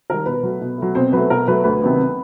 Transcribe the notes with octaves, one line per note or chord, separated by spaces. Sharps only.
D#3 G3 A#4
B2 B4
F#3 A3
B2
F#3 A3
B2 C4 C5
F#3 A3 B4
B2 A#4
F#3 A3 B4
D2 B4
C3 D#3 F#3 B3